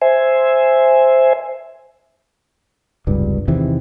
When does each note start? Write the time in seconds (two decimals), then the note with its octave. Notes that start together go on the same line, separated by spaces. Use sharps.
0.02 C5 E5 G#5
3.07 F1 C#2 G2
3.48 E2 C3 D#3 E3